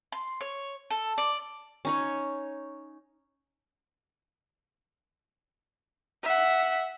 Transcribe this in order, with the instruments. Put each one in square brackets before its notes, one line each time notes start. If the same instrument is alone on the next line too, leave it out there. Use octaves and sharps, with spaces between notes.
[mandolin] C6
C#5
A4
D5
[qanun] C#4 D#4 C#5
[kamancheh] E5 F#5